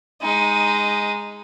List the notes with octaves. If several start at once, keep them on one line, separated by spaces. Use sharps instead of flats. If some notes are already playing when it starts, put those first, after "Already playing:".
G#3 D#4